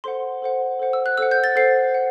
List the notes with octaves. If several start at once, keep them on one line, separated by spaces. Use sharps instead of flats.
A4 C5 F#5 C6
A4 C5 F#5
A4 C5 F#5
E6
F#6
A4 C5 F#5 E6
G6
A6
A4 C5 F#5 C7
F#5